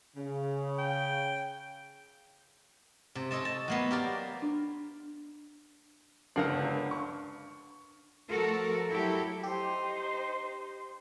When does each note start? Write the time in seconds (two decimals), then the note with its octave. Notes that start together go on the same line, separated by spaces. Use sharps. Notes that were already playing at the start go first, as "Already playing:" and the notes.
0.16 C#3
0.79 G5
3.15 C3
3.31 A4 C#5 D#5 A5
3.45 A5
3.68 F#3 A#3 B3
3.91 G4 A#4 D5
4.42 D4
6.36 G1 C#2 D4 A#4 F#5 C7
6.91 C#6
8.30 F3 A3 F#4 A4 A#4
8.89 F#3 E4 G4 A4
9.43 D#4 G4 C5